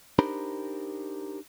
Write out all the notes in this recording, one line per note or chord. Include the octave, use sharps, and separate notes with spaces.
D4 D#4 G4 A#4 C5 B5